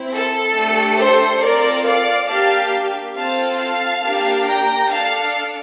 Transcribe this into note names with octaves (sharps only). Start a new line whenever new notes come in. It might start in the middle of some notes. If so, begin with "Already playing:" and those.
Already playing: C4 E4
A4
A3 D4 G4
A4 C5
C4 F4 A4 A#4 D5
D5 F5
A#3 D4 G4 F5 A5
C4 F4 A4 F5 A5
F5 A5
A#3 D4 G4
G5 A#5
D4 A4 F5 A5